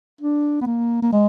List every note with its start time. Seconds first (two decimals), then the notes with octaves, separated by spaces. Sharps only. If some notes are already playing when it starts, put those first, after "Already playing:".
0.21 D4
0.61 B3
0.66 A#3
1.02 A#3
1.13 G#3